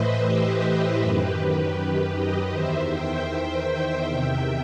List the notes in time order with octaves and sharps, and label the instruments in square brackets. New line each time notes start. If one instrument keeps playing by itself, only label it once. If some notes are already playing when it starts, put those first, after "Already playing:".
Already playing: [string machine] A2 E3 B4 C5 D#5 E5
G4
F#2 D#3 G4 B4
B4 D#5
E2 D#3 C5 E5
E5 G5
E2 C3 D#3 E5 G5